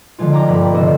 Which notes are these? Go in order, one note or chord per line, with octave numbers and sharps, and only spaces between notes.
D3 F3 G#3 F4
G5 A#5 D6
F1 G2 A#3 B5 B6
G#1 C3 C4 A4 C5 D#5